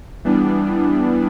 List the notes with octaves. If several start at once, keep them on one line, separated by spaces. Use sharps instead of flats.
E3 G3 B3 D4